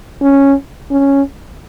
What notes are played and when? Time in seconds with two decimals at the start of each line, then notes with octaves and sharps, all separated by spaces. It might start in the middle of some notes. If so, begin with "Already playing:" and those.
0.22 C#4
0.91 C#4